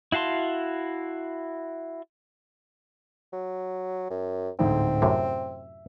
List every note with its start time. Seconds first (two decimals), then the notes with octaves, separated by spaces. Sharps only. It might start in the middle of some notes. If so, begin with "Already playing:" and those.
0.12 E4 F#4 F5 A5 C6
3.33 F#3
4.10 F#2
4.59 D1 D2 G#2 C4
5.02 F#2 A2 C3 E5